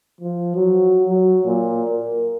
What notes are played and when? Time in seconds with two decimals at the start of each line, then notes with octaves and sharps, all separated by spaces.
0.21 F3
0.55 F#3
1.09 F#3
1.45 A#2
1.90 A#4